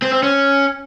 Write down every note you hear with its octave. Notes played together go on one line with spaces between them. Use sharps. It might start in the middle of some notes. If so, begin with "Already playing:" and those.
C4
C4
C#4